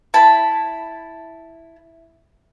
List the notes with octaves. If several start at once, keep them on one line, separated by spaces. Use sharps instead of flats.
E4 A5 B5